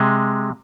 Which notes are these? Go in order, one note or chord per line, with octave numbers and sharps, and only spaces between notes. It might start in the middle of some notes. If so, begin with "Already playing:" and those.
Already playing: C3 G#3